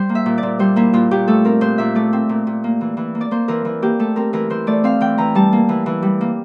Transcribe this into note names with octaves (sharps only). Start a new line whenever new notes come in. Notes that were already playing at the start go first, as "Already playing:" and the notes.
Already playing: G3 C5
A#3
E5
A#2
D5
A#2
G3 C5
A#3 E4
A#2 F4
A#2 G4
A3 A4
C4 A#4
A#2 C5
A#2 E5
A3 D5
C4
A#2
A#2
A#3
E3
E3
A#3
D5
A#3 C5
E3 A#4
E3
A#3 G4
A3 A4
C4 A#4
E3 A#4
E3 C5
A3 D5
C4 F5
E3 G5
E3 A#5
G3 A5
A#3
E3
E3
G3
A#3